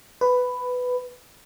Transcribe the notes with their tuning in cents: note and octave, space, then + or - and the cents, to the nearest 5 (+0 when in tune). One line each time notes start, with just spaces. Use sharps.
B4 +10